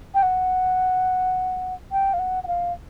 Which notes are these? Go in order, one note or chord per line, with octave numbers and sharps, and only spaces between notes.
G5
F#5
G5
F5
F#5
F#5
F5